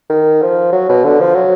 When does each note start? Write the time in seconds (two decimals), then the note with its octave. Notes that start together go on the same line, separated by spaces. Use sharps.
0.10 D#3
0.42 F3
0.72 F#3
0.89 B2
1.04 D3
1.20 F3
1.35 F#3